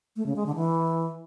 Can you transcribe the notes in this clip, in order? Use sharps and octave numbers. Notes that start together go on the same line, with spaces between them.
A3
C#3
G#3
D3
E3